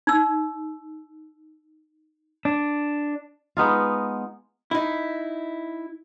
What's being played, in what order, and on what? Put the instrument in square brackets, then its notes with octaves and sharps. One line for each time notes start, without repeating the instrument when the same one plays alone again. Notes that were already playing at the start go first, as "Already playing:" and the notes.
[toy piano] D#4 E6
[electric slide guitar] D4
[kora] G#3 B3 D#4 F4
[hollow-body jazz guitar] D#4 E4